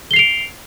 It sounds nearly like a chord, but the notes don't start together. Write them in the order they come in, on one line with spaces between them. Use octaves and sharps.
G7 C7 F7 D7